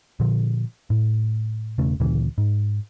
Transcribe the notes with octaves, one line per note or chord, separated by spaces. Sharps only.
A#2 D3 F3
A2
E1 C#3 A3
D2 A#2 C#3 E3
G#2